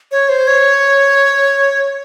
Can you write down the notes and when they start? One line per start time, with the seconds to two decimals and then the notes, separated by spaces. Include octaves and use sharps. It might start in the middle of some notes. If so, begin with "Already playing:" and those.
0.12 C#5
0.29 C5
0.47 C#5